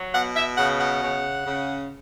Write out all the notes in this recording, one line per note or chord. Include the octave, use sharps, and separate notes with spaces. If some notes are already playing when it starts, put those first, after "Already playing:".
Already playing: F#3
B2 F#5
E5
C#3 F#5
F#5
C#3
C#3